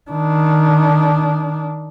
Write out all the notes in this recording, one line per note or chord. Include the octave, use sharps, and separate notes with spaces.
D#3 D4